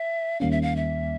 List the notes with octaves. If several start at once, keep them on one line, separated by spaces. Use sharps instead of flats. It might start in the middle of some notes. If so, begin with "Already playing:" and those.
Already playing: E5
D#2 D#3 G3 A#3 C#4 F5
E5
F5
E5